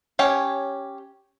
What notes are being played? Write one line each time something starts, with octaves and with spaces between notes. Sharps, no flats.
C#4 G4 C#5